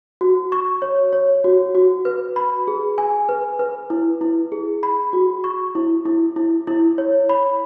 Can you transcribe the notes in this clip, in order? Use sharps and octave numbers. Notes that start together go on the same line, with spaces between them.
F#4
C#6
C#5
C#5
F#4
F#4
B4
B5
G#4
G#5
B4
B4
E4
E4
G#4
B5
F#4
C#6
E4
E4
E4
E4
C#5
B5